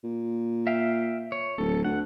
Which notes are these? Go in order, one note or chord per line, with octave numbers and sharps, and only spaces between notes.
A#2
E5 F5 G5
C#5
D1 A4
D2 F#5